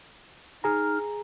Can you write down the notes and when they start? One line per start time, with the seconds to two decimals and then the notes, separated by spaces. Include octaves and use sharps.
0.64 D#4 G#4 A#5 F6